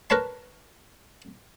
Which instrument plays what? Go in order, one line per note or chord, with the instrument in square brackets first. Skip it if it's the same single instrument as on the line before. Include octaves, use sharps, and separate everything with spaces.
[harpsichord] A#4 B4 C#5 A5 C6